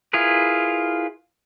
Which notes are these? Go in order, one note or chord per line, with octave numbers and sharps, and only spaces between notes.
E4 F4 G#4 A#4 B4